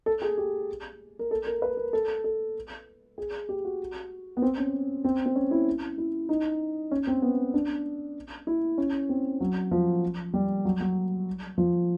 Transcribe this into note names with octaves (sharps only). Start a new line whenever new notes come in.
A4
G#4
G4
A#4
A4
A#4
B4
A#4
A4
A4
G#4
G4
F#4
B3
C4
C#4
C4
C4
C#4
E4
E4
D#4
C#4
C4
B3
D4
E4
C#4
C4
F#3
F3
G3
F#3
F#3
F3